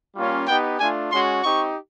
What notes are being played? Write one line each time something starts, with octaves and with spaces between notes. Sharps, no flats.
G3 A#3 C#4 F4
B3 D#4 G4 G5
A3 D4 F4 G#5
G#3 C#4 F#4 C6
C4 D#4 G4 C#6